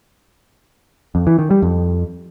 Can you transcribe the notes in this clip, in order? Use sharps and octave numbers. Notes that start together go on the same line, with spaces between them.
F2
E3
D#3
G3
F2